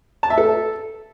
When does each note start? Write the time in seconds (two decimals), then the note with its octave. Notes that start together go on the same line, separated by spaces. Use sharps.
0.23 A5
0.30 E5
0.38 A4